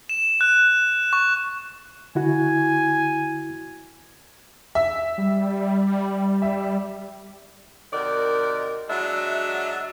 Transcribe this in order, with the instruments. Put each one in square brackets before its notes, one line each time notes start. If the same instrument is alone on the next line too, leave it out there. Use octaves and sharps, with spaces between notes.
[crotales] E7
F#6
C#6
[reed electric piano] D3 E4 F#4 [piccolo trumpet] G#5
[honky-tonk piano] E5
[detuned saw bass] G3
[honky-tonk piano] E5
[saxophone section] C3 D#3 F#4 A#4 D5
F#3 G#3 D4 E5